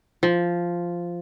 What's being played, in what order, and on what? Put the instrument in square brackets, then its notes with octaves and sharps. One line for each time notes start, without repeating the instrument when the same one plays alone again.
[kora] F3